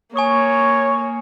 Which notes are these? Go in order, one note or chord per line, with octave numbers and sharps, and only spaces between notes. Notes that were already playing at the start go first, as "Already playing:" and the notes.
A#3 C#5 G#5 C#6 D#6